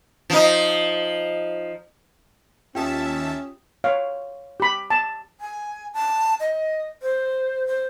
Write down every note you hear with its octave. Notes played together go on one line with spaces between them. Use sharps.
F3 D#4
D#2 C#4 F4 G4 E5 G5 A5 D#6
C#5 F5
G4 B5
A5
G#5
A5
D#5
C5
C5